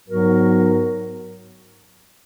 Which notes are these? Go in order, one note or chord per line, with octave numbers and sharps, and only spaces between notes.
G#2 F#3 B3 F#4 A#4